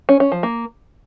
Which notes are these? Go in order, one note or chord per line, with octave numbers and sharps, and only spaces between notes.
C#4
C#4
F3
A#3